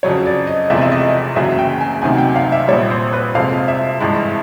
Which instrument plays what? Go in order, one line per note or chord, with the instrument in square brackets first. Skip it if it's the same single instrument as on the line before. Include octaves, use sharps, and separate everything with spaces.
[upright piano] F2 C#3 F#3 C#5
D5
D#5
F1 E2 C3 F3 G#3 E5
E5
D#5
F#1 E2 C#3 F#3 E5
G5
G#5
D2 C3 D#3 F#3 G#5
G5
F5
E5
A#1 A#2 G3 C#5
C5
B4
F2 C3 F3 G#3 F5
E5
G#1 G2 E3 G#3